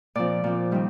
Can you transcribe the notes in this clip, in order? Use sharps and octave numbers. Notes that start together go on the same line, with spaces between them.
A#2 F3 C4 D5
A#2 F3 C4
D#3 G3 C4